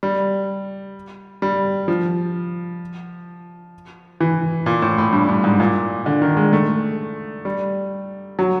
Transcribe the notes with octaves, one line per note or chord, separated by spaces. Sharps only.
G3
G3
F3
E3
A#2
A2
A2
G2
G2
G#2
A#2
D3
D#3
G#3
A3
G3
F#3